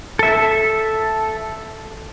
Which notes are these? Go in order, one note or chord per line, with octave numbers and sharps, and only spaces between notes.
A4 E5